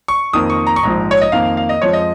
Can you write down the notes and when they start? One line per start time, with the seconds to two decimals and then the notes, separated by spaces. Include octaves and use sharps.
0.08 C#6
0.33 F2 D#3 A#3 D#6
0.50 C#6
0.67 A#5
0.76 C#6
0.83 A#1 G#2 F3 A#5
1.11 C#5
1.21 D#5
1.32 F2 D#3 A#3 F5
1.57 F5
1.69 D#5
1.82 F2 F3 G#3 C#5
1.93 D#5